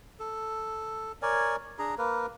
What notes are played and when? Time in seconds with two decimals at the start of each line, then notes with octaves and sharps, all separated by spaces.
0.20 A4
1.22 A#4 C#5 D5 G#5
1.79 D4 G#4 A#5
1.98 A#3 A#4 B4